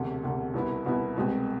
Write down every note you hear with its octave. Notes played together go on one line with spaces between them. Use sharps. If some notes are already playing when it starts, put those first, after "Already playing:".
Already playing: E1 D2 C3
E1 D2 C3
C2 B2 B3 E4
C2 B2 B3 E4
C2 B2 G#3 C4